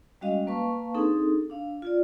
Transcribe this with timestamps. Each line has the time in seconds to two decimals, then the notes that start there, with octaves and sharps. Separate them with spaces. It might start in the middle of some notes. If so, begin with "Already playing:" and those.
0.21 G3 G#3 C#4 F#4 D#5 F5
0.47 A#3 B4 F5 A5 C#6
0.95 C4 D4 D#4 G#4 A4
1.50 D4 F5
1.82 F4 D5